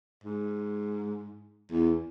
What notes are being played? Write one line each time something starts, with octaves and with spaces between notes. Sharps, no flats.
G#2
E2